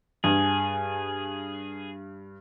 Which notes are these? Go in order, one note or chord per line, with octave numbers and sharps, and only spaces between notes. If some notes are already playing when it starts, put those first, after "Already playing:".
G2 G#4